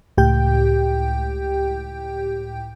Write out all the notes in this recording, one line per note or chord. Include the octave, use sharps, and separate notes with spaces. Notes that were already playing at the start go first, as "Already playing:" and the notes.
C#2 A2 G4 G5 G6